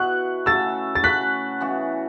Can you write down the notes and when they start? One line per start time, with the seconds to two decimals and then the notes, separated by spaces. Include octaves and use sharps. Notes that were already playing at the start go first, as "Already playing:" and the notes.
Already playing: B2 B3 E4 C#6 F#6
0.46 C#3 A3 F#4 E6 A6
0.95 A6
1.04 C#3 A3 F#4 F#6 B6
1.60 C#3 E3 B3 F#4